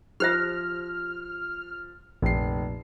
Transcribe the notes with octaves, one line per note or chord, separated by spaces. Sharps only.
F3 G4 C5 E5 F6
F1 A#1 C7